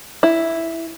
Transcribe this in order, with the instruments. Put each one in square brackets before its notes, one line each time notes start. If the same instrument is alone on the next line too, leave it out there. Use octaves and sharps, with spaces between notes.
[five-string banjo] E4